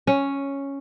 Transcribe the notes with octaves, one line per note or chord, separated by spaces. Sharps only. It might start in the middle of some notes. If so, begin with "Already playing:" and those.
C#4